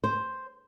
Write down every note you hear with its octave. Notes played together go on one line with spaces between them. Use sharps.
C5